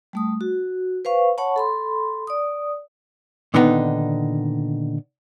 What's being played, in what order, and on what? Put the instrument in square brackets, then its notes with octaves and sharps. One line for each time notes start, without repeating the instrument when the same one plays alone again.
[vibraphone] G3 A3 D#6
F#4
B4 C5 F5 C#6
C#5 F#5 A5 B5 C#6
A4 B5 C6
D5 D#6
[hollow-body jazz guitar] A#2 D3 D#3 B3 D#4